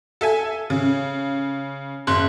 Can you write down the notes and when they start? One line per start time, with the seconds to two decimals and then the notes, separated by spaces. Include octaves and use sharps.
0.21 A4 E5 G#5
0.70 C#3
2.07 F#1 C6 F#6